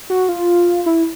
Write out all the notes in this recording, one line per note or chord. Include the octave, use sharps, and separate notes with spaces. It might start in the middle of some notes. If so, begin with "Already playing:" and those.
F#4
F4
E4